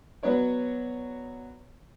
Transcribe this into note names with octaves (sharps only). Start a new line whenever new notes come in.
F#3 B3 B4 C#5 D5